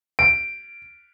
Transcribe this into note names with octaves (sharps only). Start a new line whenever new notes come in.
D7